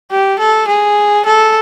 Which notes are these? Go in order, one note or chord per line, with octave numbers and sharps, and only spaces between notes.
G4
A4
G#4
A4